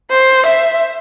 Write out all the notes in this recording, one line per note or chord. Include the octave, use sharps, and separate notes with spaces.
C5
E5